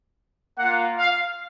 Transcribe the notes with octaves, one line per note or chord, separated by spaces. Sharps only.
A#3 F4 F#5
F5